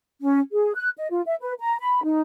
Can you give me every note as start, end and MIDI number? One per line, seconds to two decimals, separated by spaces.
0.21 0.40 61
0.52 0.73 68
0.76 0.90 90
0.98 1.08 75
1.11 1.22 65
1.26 1.35 76
1.41 1.53 71
1.60 1.79 82
1.80 2.04 83
2.04 2.21 63